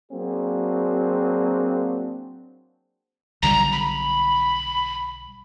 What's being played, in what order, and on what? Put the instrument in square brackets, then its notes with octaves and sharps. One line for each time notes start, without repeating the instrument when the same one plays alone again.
[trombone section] F#3 A#3 C4 D4 F#4 G#4
[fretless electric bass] B1 D3 G3 [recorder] A#5
[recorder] B5